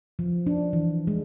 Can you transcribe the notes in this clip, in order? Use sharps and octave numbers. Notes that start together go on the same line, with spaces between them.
F3
D4
E3
G#3